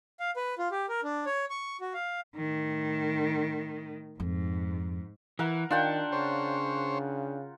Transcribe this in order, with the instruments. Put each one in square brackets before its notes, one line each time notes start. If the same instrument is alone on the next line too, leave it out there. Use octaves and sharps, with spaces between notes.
[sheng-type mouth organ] F5
B4
F4
G4
A#4
D4
C#5
C#6
F#4
F5
[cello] A2 D#3
[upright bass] F2 [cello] G#2
[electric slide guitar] E3 [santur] A#4 F#5
[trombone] D#3 [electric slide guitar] D4 [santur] F4 F#5 G5
[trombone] C#3 [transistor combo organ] C5 C#5